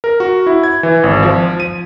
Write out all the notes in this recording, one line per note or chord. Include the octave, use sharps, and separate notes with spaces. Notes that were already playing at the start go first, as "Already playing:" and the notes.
A#4
F#4
E4
G#6
E3
G#1
F3
D#7